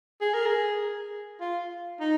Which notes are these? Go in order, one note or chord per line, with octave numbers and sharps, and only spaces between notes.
G#4
A#4
G#4
F4
D#4